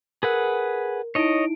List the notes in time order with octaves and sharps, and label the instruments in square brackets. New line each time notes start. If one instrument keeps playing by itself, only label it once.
[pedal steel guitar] G#4 B4 F#5 [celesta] A#4
[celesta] D#4 E4 D7 [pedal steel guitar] C#5 D#5